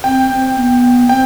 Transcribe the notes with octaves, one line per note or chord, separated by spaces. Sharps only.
C4 G5
C4
B3
C4 G5